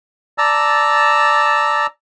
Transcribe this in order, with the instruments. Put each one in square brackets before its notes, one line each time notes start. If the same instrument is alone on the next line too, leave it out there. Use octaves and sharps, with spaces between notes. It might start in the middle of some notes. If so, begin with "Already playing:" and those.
[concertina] D5 A5 A#5 E6